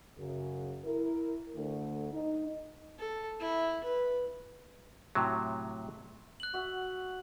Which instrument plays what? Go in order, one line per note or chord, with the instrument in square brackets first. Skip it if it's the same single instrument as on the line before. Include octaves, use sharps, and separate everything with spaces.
[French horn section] F#2 C#3
E4 A#4
D2 D3 A3
D#4
[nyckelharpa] A4
E4
B4
[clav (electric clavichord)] A2 C3 F#3
[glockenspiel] F#6 F#7
[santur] F#4 E5